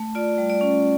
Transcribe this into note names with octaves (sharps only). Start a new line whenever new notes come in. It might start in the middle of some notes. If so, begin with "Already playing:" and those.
Already playing: A3
F4 D5
G3
D5
C#4